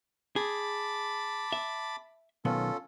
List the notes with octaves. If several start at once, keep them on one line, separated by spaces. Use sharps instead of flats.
G#4 A5 B5 D6
E5
B1 D#3 B3 C#4 F4 A4